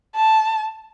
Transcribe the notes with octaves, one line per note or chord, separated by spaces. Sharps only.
A5